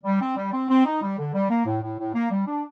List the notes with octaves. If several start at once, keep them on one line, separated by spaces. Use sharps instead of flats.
G3
C4
G3
C4
C4
D#4
G3
D3
G3
A#3
A2
A2
A2
A#3
G3
D4